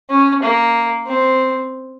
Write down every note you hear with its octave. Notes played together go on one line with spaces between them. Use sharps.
C#4
A#3
C4